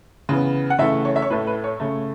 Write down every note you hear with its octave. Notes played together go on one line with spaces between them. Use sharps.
C#3 E3 B3
F#5
C#3 E3 A3 E5
C#5
E5
C#5
A2 A3 B4
B4
C#5
C#3 A3